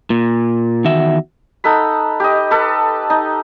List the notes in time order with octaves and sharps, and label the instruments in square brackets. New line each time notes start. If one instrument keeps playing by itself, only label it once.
[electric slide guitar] A#2
E2 D#3 F#4 E5
[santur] D#4 A4 F#5 B5
G4 D#5
A4 B4
D#4